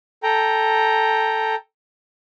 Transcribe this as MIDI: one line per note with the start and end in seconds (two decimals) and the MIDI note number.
0.23 1.55 69
0.23 1.55 79
0.23 1.55 82